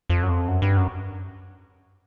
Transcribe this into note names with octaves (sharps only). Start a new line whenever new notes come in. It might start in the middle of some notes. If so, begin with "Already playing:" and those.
F2
F#2
F2
F#2
G2
F#2